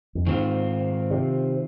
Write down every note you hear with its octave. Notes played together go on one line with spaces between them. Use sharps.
F2
G#2 D#3 C4 F4
C3